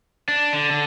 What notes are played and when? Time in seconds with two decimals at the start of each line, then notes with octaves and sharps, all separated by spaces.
0.29 D4
0.53 D3
0.71 D3